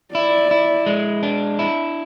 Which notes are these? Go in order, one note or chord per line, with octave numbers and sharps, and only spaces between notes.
E4 D5
E4
G#3
D4
E4